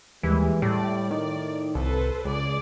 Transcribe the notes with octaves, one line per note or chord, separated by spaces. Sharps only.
D#2 E3 G3 G#3
A2 G3 D5
D#3 D5
C2 A4 B4 C5
C#2 G#4 D5